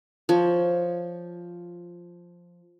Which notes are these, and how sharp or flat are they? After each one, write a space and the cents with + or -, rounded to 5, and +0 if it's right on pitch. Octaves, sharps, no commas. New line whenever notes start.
F3 +0 C#5 +10